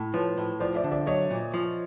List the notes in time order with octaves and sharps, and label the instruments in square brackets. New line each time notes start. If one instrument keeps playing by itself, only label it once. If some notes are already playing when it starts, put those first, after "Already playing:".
Already playing: [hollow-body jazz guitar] A2
[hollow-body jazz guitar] F3 [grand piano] B4 C#5
[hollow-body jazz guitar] A2
[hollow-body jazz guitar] F3 [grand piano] C5 D5
[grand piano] D5 E5
[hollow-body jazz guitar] D3
[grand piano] D5 E5
[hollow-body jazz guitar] F#3 [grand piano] C#5 D#5
[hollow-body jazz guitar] A#2
F3